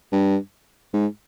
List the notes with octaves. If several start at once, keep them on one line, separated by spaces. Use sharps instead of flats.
G2
G#2